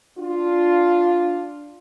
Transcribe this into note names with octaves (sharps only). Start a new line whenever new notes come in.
D4 F4